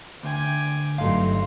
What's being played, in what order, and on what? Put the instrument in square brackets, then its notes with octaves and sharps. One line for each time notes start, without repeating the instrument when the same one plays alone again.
[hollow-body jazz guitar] D2 [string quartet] G5 G#5 D6
[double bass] G1 G2 [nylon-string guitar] F#3 A3 D#4 [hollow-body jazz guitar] F5 [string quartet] C6